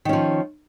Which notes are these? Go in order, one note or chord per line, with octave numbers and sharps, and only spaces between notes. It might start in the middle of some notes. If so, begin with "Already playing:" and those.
D#3 F3 C#4